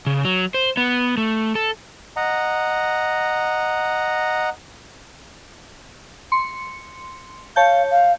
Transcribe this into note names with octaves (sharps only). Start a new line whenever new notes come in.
C#3
F#3
C5
B3
A3
A4
D#5 F#5 A#5
C6 C#7
C#5 F5 A5 G6
F5